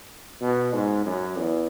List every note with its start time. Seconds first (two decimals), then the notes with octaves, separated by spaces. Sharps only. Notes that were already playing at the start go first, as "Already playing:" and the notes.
0.41 B2
0.74 G#2
1.05 F#2
1.38 E2